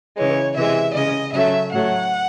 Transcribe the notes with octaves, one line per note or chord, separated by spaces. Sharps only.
C#3 E3 G#3 C#5
C3 E3 G#3 E5
C#3 G#3 D#5
C#3 F#3 A3 E5
A2 F#3 A3 F#5